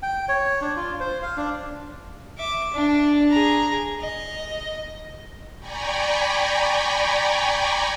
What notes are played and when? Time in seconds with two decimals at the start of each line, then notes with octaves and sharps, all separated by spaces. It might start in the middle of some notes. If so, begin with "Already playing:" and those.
0.03 G5
0.29 C#5
0.61 D4
0.76 F4
1.00 C5
1.22 F5
1.37 D4
2.38 E5 D6
2.73 D4
3.30 G#4 A#5
4.00 D#5
5.59 D5 G5 G#5 A#5 B5 C#6